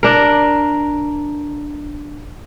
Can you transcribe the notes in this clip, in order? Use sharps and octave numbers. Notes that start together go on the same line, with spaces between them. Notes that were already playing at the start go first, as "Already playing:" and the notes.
D4 A#4